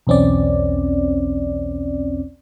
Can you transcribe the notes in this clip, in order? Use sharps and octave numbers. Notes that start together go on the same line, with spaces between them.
B1 E2 C4 C#4 D5